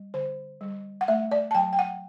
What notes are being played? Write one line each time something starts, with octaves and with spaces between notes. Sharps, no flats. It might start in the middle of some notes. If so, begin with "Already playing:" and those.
Already playing: G3
D3 C5
G3
F#5
A3 E5
D5
A5
F#3 G5
G5
F#5